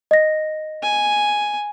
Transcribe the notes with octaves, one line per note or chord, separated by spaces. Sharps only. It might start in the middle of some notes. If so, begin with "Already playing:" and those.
D#5 A#6
G#5